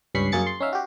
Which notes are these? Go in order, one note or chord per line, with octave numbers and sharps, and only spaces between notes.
C#2 G2 C#4 B5 C#6 C7
F#2 A#3 G#4 A6 C#7
C6
C#4 D#4 E5 F5
F#4 G4